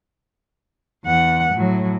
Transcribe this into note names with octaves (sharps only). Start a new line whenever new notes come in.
E2 F#5
A2 F#3